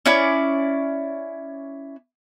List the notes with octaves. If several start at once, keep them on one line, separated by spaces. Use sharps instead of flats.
C#4 E4 D5